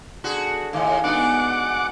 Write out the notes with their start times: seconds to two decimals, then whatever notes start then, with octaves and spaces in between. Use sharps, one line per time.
0.24 D3 F#4 G#4
0.73 D#2 A2 G#4 D5 F5
1.04 G#2 B2 B3 D4 D#4 F#5 D6